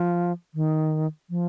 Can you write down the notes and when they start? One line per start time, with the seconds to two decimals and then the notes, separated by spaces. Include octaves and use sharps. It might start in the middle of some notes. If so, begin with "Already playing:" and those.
Already playing: F3
0.55 D#3
1.30 F3